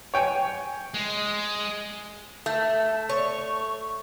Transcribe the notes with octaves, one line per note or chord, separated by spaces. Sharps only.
C#5 G5 G#5
G#3
A3 A5
C#5 C#6